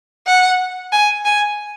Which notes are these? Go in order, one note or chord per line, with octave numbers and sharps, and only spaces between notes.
F#5
G#5
G#5